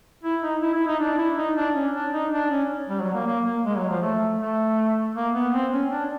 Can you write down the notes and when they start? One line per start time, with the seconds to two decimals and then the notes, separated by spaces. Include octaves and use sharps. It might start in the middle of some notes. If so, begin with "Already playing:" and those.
0.24 E4
0.43 D#4
0.63 E4
0.74 E4
0.87 D#4
1.00 D4
1.18 E4
1.37 D#4
1.56 D4
1.75 C#4
1.94 D4
2.13 D#4
2.33 D4
2.51 C#4
2.89 G3
3.01 F#3
3.14 A#3
3.27 A#3
3.45 A#3
3.65 G#3
3.77 F#3
3.90 F3
4.02 A3
4.40 A3
5.16 A#3
5.35 B3
5.53 C4
5.73 C#4
5.91 D4